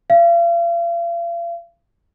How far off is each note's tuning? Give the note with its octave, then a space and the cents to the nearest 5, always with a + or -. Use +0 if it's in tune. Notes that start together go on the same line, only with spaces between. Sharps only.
F5 -40